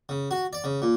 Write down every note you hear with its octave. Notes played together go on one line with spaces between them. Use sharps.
C#3
F#4
D5
C#3
A#2